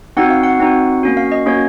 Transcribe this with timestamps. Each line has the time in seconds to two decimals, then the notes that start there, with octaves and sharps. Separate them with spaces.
0.17 C4 D#4 F#4 F#5
0.30 F5
0.43 F#5
0.60 C4 D#4 F#4
1.03 A#3 C#4 F#4
1.17 F5
1.32 D#5
1.46 A#3 C#4 F#4 C#5